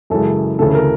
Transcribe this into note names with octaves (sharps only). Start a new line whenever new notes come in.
F#2 C#3 E3 G#3 A4
D2 C#3 E3 A3 A4
A4
A#4